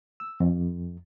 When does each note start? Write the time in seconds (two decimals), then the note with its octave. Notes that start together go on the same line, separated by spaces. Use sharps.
0.20 E6
0.40 F2